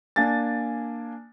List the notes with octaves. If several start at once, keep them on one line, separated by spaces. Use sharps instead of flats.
A#3 D4 G#5 A6